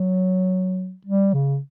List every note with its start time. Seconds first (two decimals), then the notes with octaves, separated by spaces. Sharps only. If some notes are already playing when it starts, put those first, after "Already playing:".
Already playing: F#3
1.07 G3
1.33 C#3